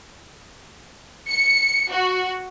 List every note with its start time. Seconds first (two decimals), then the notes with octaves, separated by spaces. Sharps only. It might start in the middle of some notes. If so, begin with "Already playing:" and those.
1.28 C#7
1.90 F#4